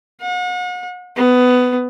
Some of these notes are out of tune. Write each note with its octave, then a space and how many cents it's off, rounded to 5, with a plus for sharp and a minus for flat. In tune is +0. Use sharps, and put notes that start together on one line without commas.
F#5 -40
B3 +15